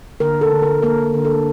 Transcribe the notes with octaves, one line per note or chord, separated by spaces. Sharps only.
D3 A#4
A4
D3
A#4
A#3 A#4
D3
A4